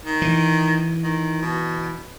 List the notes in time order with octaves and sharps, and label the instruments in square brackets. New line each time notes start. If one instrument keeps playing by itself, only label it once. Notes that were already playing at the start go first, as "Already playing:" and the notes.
[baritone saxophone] D#3
[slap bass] E3
[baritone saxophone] D#3
B2